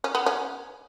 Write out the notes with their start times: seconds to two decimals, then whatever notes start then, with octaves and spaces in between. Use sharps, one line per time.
0.04 C#4
0.15 B3
0.26 C#4